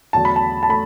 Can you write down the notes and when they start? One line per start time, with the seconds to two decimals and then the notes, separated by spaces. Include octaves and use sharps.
0.13 E2 D3 F#3 A3 A5
0.25 B5
0.36 A5
0.63 A5
0.69 A3 B5